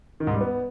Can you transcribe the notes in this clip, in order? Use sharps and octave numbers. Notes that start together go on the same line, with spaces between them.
D#3
G#2
G3
B3